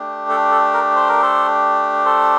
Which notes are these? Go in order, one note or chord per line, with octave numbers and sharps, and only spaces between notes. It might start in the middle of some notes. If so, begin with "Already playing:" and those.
Already playing: A3 D4 G4
A4
A4
A#4
C5
A#4
A4 C5
A4 C5